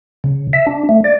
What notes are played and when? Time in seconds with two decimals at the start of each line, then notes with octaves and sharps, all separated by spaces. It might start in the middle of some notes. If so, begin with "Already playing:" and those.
0.24 C#3
0.53 E5
0.67 D4
0.89 A3
1.04 D5